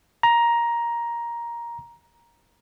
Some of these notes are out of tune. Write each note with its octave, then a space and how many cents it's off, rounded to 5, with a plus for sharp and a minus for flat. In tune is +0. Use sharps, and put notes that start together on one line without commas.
A#5 +10